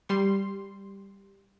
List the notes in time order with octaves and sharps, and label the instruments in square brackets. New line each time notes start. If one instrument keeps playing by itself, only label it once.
[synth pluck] G3 C6